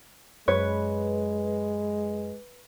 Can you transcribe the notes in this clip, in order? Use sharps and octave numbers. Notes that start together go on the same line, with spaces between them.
F#2 G#3 B4 C#5